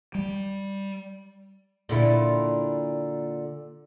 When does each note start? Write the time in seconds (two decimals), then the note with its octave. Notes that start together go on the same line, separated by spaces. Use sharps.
0.15 G3
1.89 A#2 D3 E4